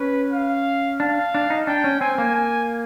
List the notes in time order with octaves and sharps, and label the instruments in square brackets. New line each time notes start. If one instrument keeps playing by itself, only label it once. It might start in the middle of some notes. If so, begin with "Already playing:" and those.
Already playing: [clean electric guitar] C#4 [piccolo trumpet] B4
[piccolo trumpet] F5
[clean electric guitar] D4 [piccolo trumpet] F5
[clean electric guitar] D4
D#4
[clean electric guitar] D4 [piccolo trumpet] G5
[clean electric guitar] C#4
[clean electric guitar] C4 [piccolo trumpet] G#5
[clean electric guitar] A#3
[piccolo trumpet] G#5